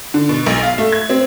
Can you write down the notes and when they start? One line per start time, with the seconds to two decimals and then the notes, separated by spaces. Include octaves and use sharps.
0.14 D3
0.29 B2
0.46 B1
0.63 F5
0.78 A3
0.92 G#6
1.10 C4